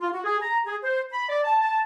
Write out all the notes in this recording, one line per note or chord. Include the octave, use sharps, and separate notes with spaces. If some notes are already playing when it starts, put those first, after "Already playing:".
F4
F#4
G#4
A#5
G#4
C5
B5
D5
A5
A5